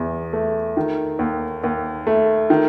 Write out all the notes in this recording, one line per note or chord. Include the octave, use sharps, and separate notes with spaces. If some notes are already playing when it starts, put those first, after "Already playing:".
Already playing: E2
A3
D#3
D#2
D#2
A3
D#3